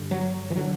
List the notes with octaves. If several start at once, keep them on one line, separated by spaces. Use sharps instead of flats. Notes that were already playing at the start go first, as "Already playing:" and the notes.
Already playing: G2 D3
F#3
E3
D3 F#3